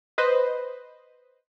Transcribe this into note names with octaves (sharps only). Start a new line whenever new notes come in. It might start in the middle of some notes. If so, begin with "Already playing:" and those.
B4 C5 D#5